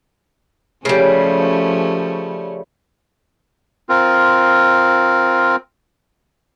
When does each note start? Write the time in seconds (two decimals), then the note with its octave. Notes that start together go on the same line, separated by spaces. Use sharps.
0.85 C#3 F3 G3 A3 C#4
3.89 C4 F4 A#4